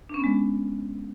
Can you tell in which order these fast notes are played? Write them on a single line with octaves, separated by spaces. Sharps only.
D4 C#4 B3 G#3